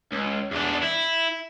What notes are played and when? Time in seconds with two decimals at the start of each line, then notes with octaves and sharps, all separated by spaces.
0.12 C#2
0.51 E2 D4
0.82 E4